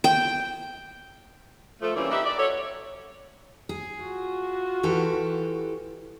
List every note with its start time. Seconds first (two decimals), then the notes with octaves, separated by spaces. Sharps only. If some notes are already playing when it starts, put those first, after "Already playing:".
0.04 G5
1.81 F3 A3
1.95 E3 G3 A#3 C4 C#4 E4
2.10 D#4 G4 B4 D5 E5
2.25 D5
2.37 F#4 A4 C#5
3.69 G#4
4.01 F4 F#4
4.83 E3 G4 A4